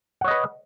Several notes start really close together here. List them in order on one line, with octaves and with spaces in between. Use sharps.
F#5 C#5 D#5 B4